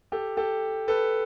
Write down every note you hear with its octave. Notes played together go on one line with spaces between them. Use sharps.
G4 A4
G4 A4
A4 B4